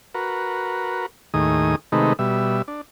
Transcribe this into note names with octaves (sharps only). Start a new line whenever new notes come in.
F#4 A#4 B4
D#2 A2 D#3 G#4 D#6
C3 D#3 G#3 A3 D#4 B4
B2 G3 E5
D4